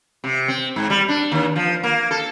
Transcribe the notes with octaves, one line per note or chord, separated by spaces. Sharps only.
C3
C4
G#2
G3
D4
D#2
F3
A#3
A4